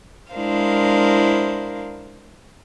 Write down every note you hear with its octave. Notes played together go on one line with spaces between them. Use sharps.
G#3 D4 E4 A#4 C5 F5